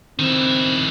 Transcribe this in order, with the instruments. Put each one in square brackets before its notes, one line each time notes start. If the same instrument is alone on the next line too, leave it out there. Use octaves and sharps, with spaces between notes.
[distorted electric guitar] D#3 E4 [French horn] C4